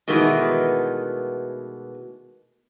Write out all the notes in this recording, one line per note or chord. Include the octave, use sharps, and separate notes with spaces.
B2 D#3 E3 G#3 A3 B3